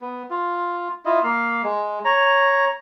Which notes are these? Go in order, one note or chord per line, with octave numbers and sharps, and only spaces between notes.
B3
F4
E4 F4 D#5
A#3 F5
G#3
C#5 A#5